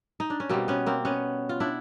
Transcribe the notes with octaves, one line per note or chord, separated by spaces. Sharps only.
D#4
D4
C#4
B2 G3 A#3 C4
B3 C#4
A#3 C4
B3 C#4
F4
D4 E4